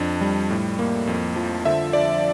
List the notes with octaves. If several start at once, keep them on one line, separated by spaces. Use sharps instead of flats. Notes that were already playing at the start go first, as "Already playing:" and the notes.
Already playing: F2 D4
G3
A2
A#3
F2
F3
D3 E5
D4 D5